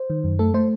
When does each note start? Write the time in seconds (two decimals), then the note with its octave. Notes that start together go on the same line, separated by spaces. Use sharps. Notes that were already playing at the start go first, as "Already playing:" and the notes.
Already playing: C5
0.10 D#3
0.24 F#2
0.39 A3 A4
0.54 A3 C5